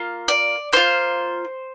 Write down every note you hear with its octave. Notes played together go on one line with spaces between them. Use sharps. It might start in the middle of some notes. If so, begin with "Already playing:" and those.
Already playing: A#3 F4
D5
A#3 F4 C5